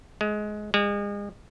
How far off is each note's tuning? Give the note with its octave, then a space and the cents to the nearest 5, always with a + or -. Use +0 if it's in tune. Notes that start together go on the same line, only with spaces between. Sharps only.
G#3 +20
G#3 -35